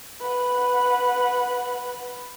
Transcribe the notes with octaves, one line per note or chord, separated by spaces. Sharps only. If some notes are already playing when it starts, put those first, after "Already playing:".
B4 F#5